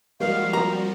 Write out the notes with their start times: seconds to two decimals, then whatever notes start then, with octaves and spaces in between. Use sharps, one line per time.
0.20 F3 G3 G#3 A#3 D#4 F#4 F5
0.53 F#3 A#3 C4 A#5